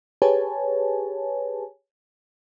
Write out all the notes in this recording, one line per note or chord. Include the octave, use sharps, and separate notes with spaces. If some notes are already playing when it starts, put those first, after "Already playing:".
G4 G#4 B4 C#5 G#5 A5